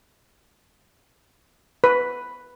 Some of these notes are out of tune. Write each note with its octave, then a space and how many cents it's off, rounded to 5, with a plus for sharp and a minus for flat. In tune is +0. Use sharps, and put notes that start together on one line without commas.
B4 +5